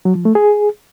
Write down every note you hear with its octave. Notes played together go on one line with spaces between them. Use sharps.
F#3
F3
A3
G#4